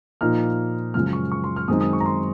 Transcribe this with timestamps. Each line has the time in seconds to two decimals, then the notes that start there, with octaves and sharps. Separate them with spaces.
0.21 A#2 F3 A#3 D#4 F6
0.94 F#2 C#3 F3 G#3 F6
1.13 C#6
1.32 C#6
1.44 C6
1.56 F6
1.68 F#2 D#3 G#3 C4 D#4 D#6
1.81 D#6
1.93 C#6
2.00 A#5
2.06 C6